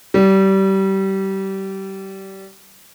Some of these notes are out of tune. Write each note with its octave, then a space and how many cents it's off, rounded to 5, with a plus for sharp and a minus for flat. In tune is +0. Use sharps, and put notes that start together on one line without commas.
G3 -25